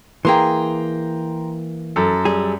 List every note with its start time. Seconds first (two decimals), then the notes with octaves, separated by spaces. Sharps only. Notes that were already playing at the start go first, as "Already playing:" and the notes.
0.25 E3 A#3 G#4 G5 A#5 C6
1.96 F#2 A4
2.25 G3 G#4